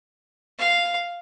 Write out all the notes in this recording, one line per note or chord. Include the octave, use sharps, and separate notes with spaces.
F5